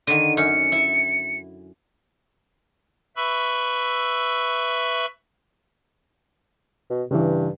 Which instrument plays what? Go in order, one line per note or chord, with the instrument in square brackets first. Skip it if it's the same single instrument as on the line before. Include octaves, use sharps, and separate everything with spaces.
[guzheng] D3 D#3 [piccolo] D#7
[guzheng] F#2 C#4 [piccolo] C#7
[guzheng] E4 E5
[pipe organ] B4 E5 B5 C#6 E6
[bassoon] B2
[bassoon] G2 [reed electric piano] C#3 E3